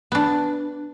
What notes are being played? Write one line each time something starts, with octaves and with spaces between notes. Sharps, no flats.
B3 D4